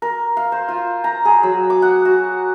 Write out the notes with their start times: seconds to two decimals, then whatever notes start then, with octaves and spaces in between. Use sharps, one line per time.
0.02 A#4
0.37 F5
0.52 C5
0.68 F4
1.04 A#5
1.25 G#4
1.43 F#3
1.70 D6
1.82 F#5
2.05 F#4